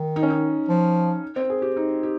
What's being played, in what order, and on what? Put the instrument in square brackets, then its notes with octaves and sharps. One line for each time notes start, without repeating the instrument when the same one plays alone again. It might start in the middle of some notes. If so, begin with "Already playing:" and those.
Already playing: [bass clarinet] D#3
[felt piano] D#4
C#4
D#4
[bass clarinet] F3
[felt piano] C4
G#4
G4
D#4
G4